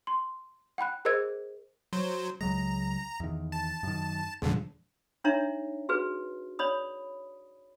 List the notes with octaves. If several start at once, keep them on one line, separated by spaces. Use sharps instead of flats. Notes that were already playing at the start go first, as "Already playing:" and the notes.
C6
F#5 G5 B5 F#6
G#4 A#4 C5 D#5 E6 G#6
F#3 C5
C#2 F#3 G#3 A#5
E2 D#3
A5
F#2 D#3
E2 G2 A#2 D3 F3 G#3
D4 D#4 C#5 E5 A#5
F#4 G#4 B4
C#5 D5 B5 D#6